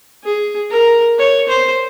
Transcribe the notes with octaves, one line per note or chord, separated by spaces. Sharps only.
G#4
A#4
C#5
C5